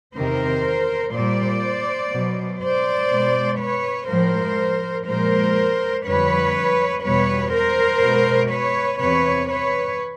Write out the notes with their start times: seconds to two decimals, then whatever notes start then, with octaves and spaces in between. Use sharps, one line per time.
0.15 E2 C3 D#3 A#4 C5
1.13 A#2 G3 C5 D5
2.12 B2 F#3
2.61 C5 D5
3.10 B2 G#3
3.59 B4 C#5
4.08 A2 F3 G#3 A#4 C5
5.06 A#2 F3 G#3 A#4 C5
6.05 F2 D3 G3 B4 C#5
7.03 E2 B2 G3 B4 C#5
7.52 A#4 C5
8.02 B2 G#3
8.50 B4 C#5
8.99 E2 C3 E3 B4 C#5
9.49 B4 C#5